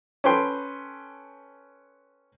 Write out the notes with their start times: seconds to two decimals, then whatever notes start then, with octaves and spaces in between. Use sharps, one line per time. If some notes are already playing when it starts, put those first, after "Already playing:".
0.24 C#4 A4 B4 G5 C6